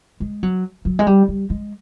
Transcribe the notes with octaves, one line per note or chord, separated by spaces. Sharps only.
G#3
F#3
F#3
G#3
G3
G3
G#3